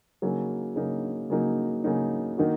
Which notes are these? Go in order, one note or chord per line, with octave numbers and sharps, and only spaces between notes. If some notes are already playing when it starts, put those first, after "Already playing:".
C#3 F#3 A#3 D#4
C#3 F#3 A#3 D#4
C#3 F#3 A#3 D#4
C#3 F#3 A#3 D#4
D#3 A#3 D#4 F#4